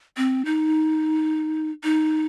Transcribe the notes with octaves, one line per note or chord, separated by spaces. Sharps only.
C4
D#4
D#4